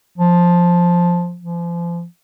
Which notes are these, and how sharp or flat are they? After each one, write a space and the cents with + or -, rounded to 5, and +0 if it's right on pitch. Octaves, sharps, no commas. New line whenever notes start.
F3 +5
F3 -35